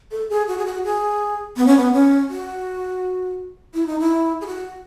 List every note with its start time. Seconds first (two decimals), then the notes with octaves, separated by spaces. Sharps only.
0.11 A4
0.30 G#4
0.48 F#4
0.58 G#4
0.66 F#4
0.84 G#4
1.57 B3
1.67 C#4
1.77 B3
1.93 C#4
2.29 F#4
3.74 E4
3.87 D#4
4.00 E4
4.41 G#4
4.47 F#4